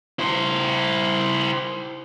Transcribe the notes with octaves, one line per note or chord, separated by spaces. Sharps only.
E4 C5